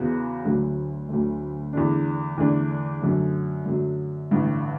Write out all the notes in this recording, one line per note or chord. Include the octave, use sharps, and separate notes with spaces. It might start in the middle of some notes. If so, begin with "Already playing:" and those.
Already playing: E2 C#3 E3 B3 F#4
D2 D3 F#3 A3
D2 D3 F#3 A3
E2 D3 A3 D4
E2 D3 A3 D4
F#2 D3 F#3 A3
F#2 D3 F#3 A3
A1 G2 D3 G3